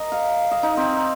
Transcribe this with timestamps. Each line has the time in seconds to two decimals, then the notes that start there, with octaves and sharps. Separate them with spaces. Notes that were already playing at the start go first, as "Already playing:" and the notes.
Already playing: A#4 D#5
0.12 F5
0.51 D#5
0.63 D#4
0.77 C4